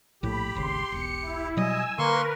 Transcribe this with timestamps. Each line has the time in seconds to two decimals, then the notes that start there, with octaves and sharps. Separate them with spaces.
0.23 A#1 A2 G4 B5
0.55 D#1 G#1 C#3 C6
0.92 E1 B1 C#7
1.22 E4
1.57 B2 F#3 G3 D#5 G#5 E6
1.98 D3 A#3 A#4 B4 C6 C#6